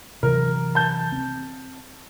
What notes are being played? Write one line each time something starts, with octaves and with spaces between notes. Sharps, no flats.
C3 E3 F#3 A#4
A5 G6
C4